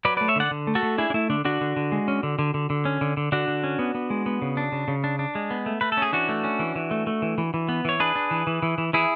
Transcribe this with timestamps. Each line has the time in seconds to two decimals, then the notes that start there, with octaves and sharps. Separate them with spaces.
0.05 F#3 B4 D5
0.17 A3 B4 D5
0.28 C#5 E5
0.36 D3 D5 F#5
0.51 D3
0.67 A3
0.75 F#4 A4
0.83 A3
0.98 D4 E4 G#4
1.10 D4
1.14 A3 E4
1.30 D3 D4
1.45 D3 D4 F#4
1.61 D3
1.76 D3
1.92 G#3
2.08 C#4
2.23 D3
2.39 D3
2.54 D3
2.70 D3
2.85 C#4
3.01 D3
3.17 D3
3.32 D3 D4 F#4
3.48 D3
3.64 C#4
3.79 B3
3.95 B3
4.10 G#3
4.26 B3
4.42 C#3
4.57 D4
4.72 C#3
4.88 C#3
5.04 D4
5.19 D4
5.35 G#3
5.51 B3
5.66 A3
5.81 A3 B4
5.92 A4
5.97 C#4 G#4
6.13 E3 D4 F#4
6.29 A3
6.44 C#4
6.59 E3
6.76 E3
6.91 A3
7.07 A3
7.22 E3
7.38 E3
7.54 E3
7.69 B3
7.85 E3 C#5
8.00 D4 G#4 B4
8.16 D4
8.31 E3
8.47 E3
8.63 E3
8.78 E3
8.93 E3 E4 G#4